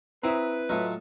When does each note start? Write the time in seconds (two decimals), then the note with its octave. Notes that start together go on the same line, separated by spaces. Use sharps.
0.23 C4 E4 B4 A#5 D#6
0.69 A2 F#3 F4 D#5